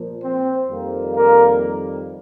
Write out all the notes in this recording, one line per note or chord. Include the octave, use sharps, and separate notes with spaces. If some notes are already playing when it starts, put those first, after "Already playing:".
Already playing: A#2 F3 A#3
C4 C5
F2 D#3 G3 A#3
A#3 A#4